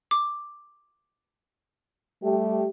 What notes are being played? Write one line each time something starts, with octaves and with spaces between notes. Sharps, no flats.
D6
G3 A3 G4